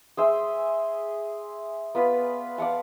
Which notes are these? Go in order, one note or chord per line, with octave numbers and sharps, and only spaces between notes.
G#4 C5 E5
B3 F4 B4 D5
D5 F5 F#5 A5